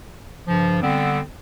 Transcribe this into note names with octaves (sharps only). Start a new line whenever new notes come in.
G2 C#3 F3
D3 G3 B3 C4